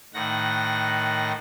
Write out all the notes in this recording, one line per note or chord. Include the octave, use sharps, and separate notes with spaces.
A2 D#3 F#5 A#6